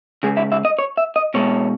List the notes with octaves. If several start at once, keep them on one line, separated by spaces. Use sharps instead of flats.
C#3 G#3 G#4
E5
E5
D#5
C#5
E5
D#5
B2 G#3 C#5